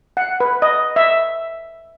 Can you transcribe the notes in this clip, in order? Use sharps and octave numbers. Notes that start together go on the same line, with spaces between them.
F#5
B4
D#5
E5